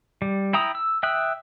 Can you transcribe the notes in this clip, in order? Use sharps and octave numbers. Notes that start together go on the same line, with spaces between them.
G3
E4 G5 A#5 D#6
E6
E5 G5 D#6 E6 F#6